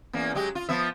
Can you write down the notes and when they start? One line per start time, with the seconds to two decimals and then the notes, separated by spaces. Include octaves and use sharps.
0.13 E2 A#3 C#4
0.34 F#3 G#3 G4
0.55 F4
0.69 F3 B3 E5